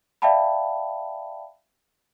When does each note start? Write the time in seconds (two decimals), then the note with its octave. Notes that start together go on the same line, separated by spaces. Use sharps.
0.22 D5 E5 F5 G5 A5 B5